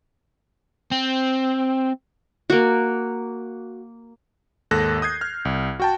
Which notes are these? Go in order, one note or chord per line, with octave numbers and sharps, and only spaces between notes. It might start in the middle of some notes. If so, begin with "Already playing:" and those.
C4
A#3 F#4
D#2 G#2 A4 F#6 A#6
D#6 G6 G#6 C7
F6
C2
F#4 G5 A5